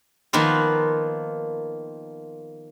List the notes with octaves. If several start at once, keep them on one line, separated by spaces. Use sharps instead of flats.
D#3 F3 A#3 B3 F4